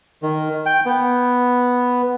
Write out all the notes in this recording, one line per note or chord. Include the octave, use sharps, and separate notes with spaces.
D#3
G5
B3